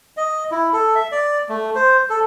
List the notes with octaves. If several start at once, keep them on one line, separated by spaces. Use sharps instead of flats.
D#5
E4
A4
E5
D5
A3
C5
A4